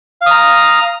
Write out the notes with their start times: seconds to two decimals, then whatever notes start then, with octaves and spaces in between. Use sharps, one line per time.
0.21 F5
0.26 D#6
0.31 A#5